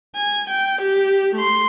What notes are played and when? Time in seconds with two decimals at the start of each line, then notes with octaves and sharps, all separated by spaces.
0.15 G#5
0.50 G5
0.82 G4
1.35 A3 C6